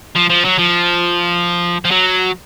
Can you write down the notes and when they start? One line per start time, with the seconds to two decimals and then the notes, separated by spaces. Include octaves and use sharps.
0.15 F3
0.30 F3
0.45 F#3
0.59 F3
1.85 F3
1.91 F#3